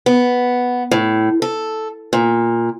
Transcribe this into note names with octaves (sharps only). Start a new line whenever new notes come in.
B3
A2
A4
A#2